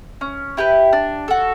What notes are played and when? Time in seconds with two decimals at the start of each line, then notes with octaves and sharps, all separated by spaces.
0.21 C#4
0.57 E4 G4 B4
0.93 D4
1.28 F#4 A4